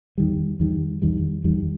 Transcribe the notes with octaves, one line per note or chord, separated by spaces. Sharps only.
E2 D#3 G3
E2 D#3 G3
E2 D#3 G3
E2 D#3 G3